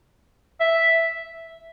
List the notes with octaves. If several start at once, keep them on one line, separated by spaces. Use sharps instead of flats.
E5